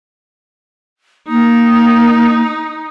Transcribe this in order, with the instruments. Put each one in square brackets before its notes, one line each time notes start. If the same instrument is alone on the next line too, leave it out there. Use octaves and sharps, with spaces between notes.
[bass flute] A#3 [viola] D#4